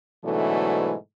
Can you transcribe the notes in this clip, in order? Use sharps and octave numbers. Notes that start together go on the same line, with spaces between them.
G#2 B2 D3 E3 F#3 A3